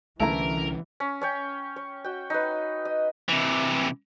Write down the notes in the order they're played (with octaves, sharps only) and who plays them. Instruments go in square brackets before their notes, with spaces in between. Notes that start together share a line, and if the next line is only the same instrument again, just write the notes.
[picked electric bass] C2 D3 C#4 [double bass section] E3 [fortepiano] A3 E4 A#5 [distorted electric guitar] A#4
[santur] C#4
C#4 C#5 G5
C#5
F#4 G5
D#4 B4
D#5
[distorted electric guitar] C3 E3